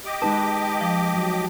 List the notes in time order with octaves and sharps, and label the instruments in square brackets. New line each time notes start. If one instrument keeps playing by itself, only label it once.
[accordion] G4 D#5 D6
[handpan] G#3 D#4 B4 [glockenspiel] A5
[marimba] F3
[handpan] F#3